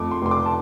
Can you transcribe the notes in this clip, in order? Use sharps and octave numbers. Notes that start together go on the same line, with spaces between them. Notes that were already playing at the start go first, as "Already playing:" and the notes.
Already playing: F2 A3 D6
C6
F1 C6
D6
A5